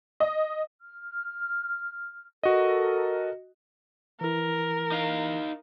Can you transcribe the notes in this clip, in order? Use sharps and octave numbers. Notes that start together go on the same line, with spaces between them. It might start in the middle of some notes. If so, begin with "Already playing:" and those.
D#5
F6
F#4 A4 A#4 D#5
E3 E4 A#4
D#4 F5